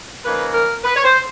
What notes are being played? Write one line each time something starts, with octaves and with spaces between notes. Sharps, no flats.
C#3 F3 A#3 D#4 B4
A#4
B4
C#5
C5